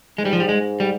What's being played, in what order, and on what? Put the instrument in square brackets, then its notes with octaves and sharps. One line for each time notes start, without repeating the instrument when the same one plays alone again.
[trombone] G#2 [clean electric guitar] G#3
[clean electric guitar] G3
F3
G3
G#3
G3